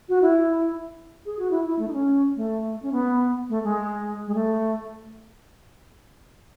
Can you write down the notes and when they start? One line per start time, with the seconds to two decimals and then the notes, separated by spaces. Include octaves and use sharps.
0.09 F#4
0.22 E4
1.26 G#4
1.39 F#4
1.51 E4
1.65 E4
1.79 A3
1.88 D#4
1.93 C#4
2.36 A3
2.83 C#4
2.92 B3
3.49 A3
3.64 G#3
4.27 G#3
4.35 A3